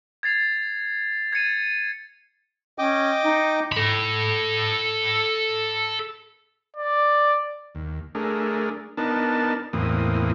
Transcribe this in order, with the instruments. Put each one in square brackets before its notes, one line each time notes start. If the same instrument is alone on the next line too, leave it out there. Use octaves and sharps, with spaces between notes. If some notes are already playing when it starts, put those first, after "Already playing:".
[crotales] G#6 A6 C7 F7
G#6 A6 C#7 D#7
[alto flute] C#4 [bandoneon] D#5 G5 D6
[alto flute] D#4
[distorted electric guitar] A4 B5
[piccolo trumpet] D5
[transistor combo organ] D#2
A3 D4 G#4 A#4
B3 D4 D#4 A#4 A5
E2 A2 E3 A#3 C4 D#6